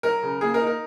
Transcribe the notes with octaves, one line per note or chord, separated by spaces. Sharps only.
F#3 A#4
C#3
A#3 G#4
A#4
D#4
A#4